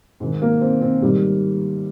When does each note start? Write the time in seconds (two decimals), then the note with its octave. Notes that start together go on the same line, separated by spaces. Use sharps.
0.20 G#2 D#3
0.42 A#3
0.61 C4
0.82 C4
1.02 G#2 D#3 G3